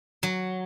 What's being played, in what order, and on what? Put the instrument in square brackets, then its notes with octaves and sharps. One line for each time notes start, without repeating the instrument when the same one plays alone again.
[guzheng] F#3